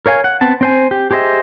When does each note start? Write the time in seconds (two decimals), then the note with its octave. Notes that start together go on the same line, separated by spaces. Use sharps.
0.06 A#4 C#5 F5 G#5
0.24 F#5
0.41 B3 C4 A5
0.61 C4 C5 G#5
0.91 G4
1.11 G4 G#4 C5 D#5 E5